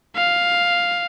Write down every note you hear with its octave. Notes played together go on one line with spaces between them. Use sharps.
F5